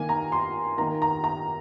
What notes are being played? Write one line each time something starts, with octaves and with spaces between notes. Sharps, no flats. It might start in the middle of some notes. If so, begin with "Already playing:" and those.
Already playing: D#3 A#3 G#5
A#5
C6
D#3 A#3 A#5
A#5
A#5